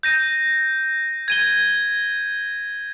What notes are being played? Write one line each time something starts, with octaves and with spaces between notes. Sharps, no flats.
G6 A#6 D#7
G#6 D#7 G7